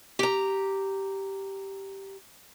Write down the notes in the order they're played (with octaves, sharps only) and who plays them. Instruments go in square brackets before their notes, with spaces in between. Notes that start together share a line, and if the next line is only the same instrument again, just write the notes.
[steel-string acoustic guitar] G4 A#5